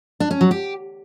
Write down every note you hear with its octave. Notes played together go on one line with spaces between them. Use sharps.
D4
C#4
F#3
G4